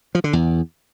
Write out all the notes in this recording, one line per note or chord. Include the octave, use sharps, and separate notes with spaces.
F3
D3
E2